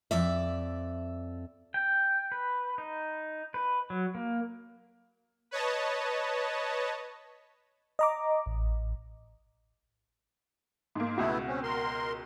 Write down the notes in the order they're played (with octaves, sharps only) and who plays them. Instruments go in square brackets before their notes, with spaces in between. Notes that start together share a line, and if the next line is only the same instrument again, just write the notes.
[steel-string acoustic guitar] F2 D5 E5
[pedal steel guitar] G5
B4
D#4
B4
F#3
A#3
[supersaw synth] B4 C#5 D#5 A5
[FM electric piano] D#5 A#5 D6
A1
[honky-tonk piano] G#2 A#3
[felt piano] C#2 B2 [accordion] A3 B3 E4 [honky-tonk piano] F#4
[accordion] C4 C#4
A#4 C6